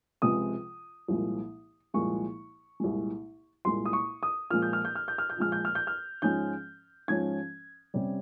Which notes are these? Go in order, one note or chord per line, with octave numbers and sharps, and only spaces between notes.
C#2 C3 F3 G#3 D#6
C2 A#2 F3 G#3
C2 A#2 F3 G#3 C#6
C2 A#2 G#3
C2 A#2 G#3 C6
D#6
C#6
D#6
A#2 F3 G#3 F6
G6
F6
G6
F6
G6
F6
G6
A#2 F3 G#3 F6
G6
F6
G6
F6
G#2 F3 G#3 C#4 G6
G#2 F3 G#3 C#4 G#6
C3 G3 C#4